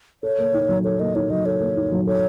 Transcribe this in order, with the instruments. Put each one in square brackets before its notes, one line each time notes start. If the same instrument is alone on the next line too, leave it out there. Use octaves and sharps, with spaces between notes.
[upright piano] A4 [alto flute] C#5
[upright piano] A#3
D#4
F#3
[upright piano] A4 [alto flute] C#5
[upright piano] A#3 [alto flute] D#5
[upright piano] D#4 [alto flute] C#5
[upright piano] F#3 [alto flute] D#5
[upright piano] A4 [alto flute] C#5
[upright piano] A#3
D#4
F#3
[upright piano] A4 [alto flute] C#5